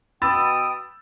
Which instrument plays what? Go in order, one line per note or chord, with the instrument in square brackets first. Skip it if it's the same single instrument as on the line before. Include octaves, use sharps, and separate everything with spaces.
[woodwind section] B2 D#6 [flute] G5 [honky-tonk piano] B5 E6 A6